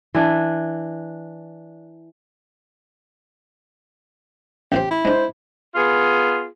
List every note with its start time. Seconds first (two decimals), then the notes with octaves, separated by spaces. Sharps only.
0.14 E3 D4
4.72 A1 A2 G4 C5
4.91 E4
5.05 G#3 D4 C5
5.75 B3 F4 G#4